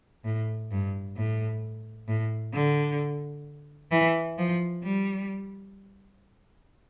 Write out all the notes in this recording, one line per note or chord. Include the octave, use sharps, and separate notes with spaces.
A2
G2
A2
A2
D3
E3
F3
G3